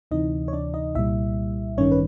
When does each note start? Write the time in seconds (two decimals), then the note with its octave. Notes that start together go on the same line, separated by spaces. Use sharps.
0.11 D2 C3 E3 D#4 D#5
0.48 C#5
0.53 D4 D5
0.74 D#4 D#5
0.95 C2 A#2 G3 E4 E5
1.77 A1 G2 D#3 C#4 C#5
1.92 B4